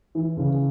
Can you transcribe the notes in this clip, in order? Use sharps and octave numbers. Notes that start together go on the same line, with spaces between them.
E3
C#3